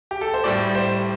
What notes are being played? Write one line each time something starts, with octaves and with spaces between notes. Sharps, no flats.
G4
A4
C5
A2 G3 D5
C5